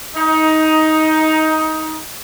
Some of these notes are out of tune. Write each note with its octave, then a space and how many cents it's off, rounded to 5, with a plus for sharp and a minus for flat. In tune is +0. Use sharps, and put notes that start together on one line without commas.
D#4 +15